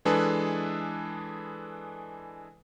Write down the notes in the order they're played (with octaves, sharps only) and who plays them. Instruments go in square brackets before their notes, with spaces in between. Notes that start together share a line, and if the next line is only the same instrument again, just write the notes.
[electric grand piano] E3 G#3 D4 G#4 A4 B4